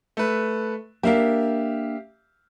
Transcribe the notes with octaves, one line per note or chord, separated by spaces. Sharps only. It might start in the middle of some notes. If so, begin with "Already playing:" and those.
A3 B4
A#3 D4 G4 A#4 E5 F5